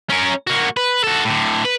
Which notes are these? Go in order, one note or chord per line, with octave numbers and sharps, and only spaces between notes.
C#4 A#4
A#3 F#4
B4
F#4 A4
A2 D3
B4